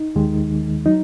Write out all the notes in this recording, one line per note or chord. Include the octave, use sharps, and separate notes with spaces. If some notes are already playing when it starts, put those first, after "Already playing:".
Already playing: D#4
D#2 D#3 G#3
F#3 D#4